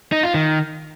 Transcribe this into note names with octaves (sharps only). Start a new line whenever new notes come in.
D#4
F4
D#3